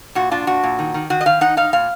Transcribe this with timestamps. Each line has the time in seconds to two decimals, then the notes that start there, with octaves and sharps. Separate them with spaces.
0.15 A#2 F#4
0.31 D4 F4
0.47 A#2 F#4
0.63 A#2
0.79 D#3
0.94 D#3
1.10 D#3 F#4
1.21 D#5
1.26 D#3 F5
1.41 D#4 F#5
1.57 D#4 F5
1.73 A#2 F5